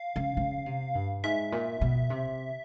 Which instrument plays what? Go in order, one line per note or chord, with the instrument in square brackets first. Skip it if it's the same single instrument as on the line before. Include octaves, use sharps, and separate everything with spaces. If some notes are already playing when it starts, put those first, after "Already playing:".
Already playing: [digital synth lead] F5
[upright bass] C#3
C#3
C3
G2
[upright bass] G#2 [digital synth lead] E5
[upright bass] A#2
B2
C3